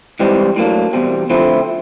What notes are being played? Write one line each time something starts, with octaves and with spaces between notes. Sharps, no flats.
G#2 E3 G3 C4
A2 F#3 A#3 D4
E2 B2 G3 C4
D3 F3 A3 C4 E4